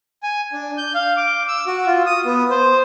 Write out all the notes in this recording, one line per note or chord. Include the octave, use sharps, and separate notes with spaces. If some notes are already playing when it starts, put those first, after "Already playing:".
G#5
D4
G6
F5
D6
E6
F#4
F4
D#6
B3
C5